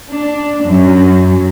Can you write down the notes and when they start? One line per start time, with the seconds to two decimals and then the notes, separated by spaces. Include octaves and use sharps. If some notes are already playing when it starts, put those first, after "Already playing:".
0.11 D4
0.64 F#2